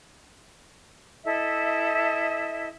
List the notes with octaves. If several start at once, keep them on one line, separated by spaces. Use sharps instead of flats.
E4 A4 D#5 E5